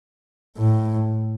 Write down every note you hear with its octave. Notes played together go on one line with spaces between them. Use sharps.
A2